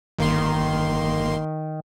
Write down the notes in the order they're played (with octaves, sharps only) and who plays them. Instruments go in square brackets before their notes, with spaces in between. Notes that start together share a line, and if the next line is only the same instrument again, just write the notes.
[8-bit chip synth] G1 A#3 C6 [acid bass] D#3